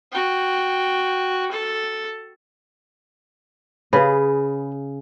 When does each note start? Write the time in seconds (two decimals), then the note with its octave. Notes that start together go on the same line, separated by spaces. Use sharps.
0.12 F#4 G5
1.52 A4
3.93 C#3 G#4 B4